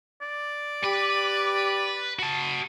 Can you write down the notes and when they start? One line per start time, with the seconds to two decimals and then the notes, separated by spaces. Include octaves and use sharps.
0.21 D5
0.84 G4 B4
2.19 F#4 A5